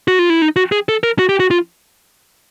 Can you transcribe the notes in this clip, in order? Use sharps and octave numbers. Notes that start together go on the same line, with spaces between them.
F#4
F4
E4
D#4
F#4
G#4
A4
A#4
F#4
G4
F#4
F4